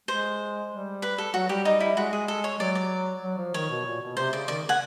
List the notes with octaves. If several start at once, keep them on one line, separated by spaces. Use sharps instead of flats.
G#3 C5
G3
B4
A4
F#3 F#4
G3 G4
D#4
E4
G#3 F#4
G#4
A4
C#5
F#3 D5
D5
F#3
F3
D#3 C#5
B2
A#2
B2
C3 C5
C#3 D5
D#3 D5
C#3
F#5 G#5